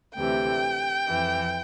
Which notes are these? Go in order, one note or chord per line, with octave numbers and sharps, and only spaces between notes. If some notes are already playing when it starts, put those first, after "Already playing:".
D2 C3 E3 G5
F2 E3